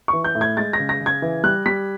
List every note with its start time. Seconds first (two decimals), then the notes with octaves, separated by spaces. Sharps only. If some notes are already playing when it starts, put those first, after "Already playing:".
0.08 E3 C#6
0.24 G6
0.35 A2
0.41 G#6
0.57 G#3 A6
0.73 A#6
0.79 C#3
0.89 A#6
1.00 C#3
1.06 G#6
1.22 E3
1.44 G3 F#6
1.66 G3 B6